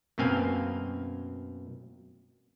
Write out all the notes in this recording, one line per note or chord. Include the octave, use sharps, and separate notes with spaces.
F#2 B2 A#3 C4 F5 G#5